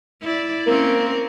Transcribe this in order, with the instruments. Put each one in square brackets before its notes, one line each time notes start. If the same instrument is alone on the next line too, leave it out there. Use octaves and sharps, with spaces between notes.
[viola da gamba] E4 D5
[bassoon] A#3 [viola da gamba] C4 C#4 A#4